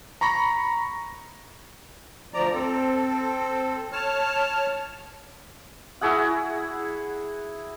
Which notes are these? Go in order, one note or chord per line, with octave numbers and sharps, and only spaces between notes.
A#5 B5 C#6 A#6
D2 F3 D5 A#5
C4 A4
C#5 A5 F6
E4 F#4 G#4 F#5